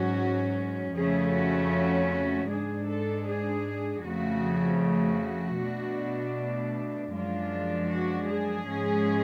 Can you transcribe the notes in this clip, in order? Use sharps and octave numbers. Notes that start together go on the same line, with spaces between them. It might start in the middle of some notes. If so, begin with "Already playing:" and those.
Already playing: G#2 F#3 C#4 F#4
F2 C#3 F3 A3 C#4 G#4
F#4
F#4
F#4
G#2 G#3 D4 G#4
A4
G#4
F2 C#3 F3 A3 F#4
F#4
B2 A3 D4
F#2 F3 G#3 D4 F4
F#4
G#4
G#2 F3 G#3 C#4